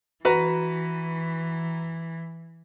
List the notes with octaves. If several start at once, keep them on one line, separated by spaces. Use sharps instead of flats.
E3 F#4 B4 A#5